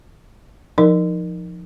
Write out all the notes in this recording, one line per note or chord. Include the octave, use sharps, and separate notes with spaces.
F3 D#4 A#4